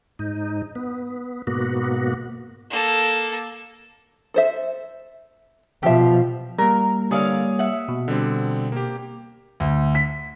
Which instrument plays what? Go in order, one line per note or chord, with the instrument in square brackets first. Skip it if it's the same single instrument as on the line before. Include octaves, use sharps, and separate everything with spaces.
[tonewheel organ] G#2 D#4
B3
G#2 B2 A#3 B3 F#4
[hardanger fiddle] A#3 A4
[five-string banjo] A4 C5 E5
[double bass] B2 F3 [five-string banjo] G4 E5
[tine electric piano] G3 A#3 [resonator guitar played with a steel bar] A#4
[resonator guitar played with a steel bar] D3 D5 F5 [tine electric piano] G3 A#3 [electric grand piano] C#5 G#5 D#6
[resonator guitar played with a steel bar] E5 F#5
[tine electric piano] B2
[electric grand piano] D3 G3 C4
A#3 G4
[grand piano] D2
B6